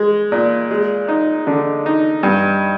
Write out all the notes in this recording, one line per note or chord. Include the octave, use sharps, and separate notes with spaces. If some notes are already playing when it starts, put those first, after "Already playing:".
Already playing: G#3
A#2
G#3
D#4
D3
D#4
G2